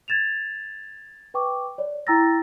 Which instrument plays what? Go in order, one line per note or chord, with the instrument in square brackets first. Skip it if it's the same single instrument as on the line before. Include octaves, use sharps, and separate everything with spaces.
[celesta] G#6 A6 E7 F7
B4 G5 C#6 D6
C#5 D5
E4 G5 A#5 E6 A6 A#6